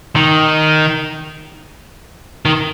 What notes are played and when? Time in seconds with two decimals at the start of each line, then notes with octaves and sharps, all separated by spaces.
0.16 D#3
2.45 D#3